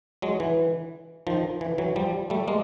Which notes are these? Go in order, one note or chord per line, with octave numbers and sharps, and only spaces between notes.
F#3 G#3
E3
D#3 F3
E3
E3 F#3
F3 G3
G3 A3
G#3 A#3